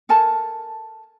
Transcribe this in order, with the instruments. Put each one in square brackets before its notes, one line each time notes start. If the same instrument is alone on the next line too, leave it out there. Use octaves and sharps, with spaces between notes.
[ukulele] A4 A#4 G#5 A5